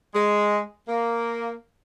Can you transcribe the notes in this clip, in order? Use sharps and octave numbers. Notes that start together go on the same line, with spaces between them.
G#3
A#3